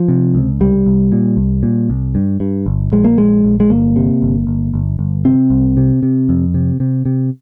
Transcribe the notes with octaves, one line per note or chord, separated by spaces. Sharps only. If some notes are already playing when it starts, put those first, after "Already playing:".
Already playing: F3
C3
C#2
C2 G3
C2
A#2
C2
A#2
C2
G2
G2
G1
A#1 G#3
A#3
A#1 G#3
A#1
G#3
G1 A#3
C3
G1
G1
G1
G1
C3 C4
C2
C3
C3
F2
C3
C3
C3